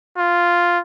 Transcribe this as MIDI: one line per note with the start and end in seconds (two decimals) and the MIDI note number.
0.18 0.80 65